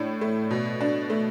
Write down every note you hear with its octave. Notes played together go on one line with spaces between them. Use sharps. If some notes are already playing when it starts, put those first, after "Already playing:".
Already playing: A2 D4
A3
B2
D4
A3